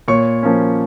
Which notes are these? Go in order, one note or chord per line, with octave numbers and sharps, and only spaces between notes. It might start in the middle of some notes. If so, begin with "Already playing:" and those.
A#2 C#5 C#6
F3 A#3 C#4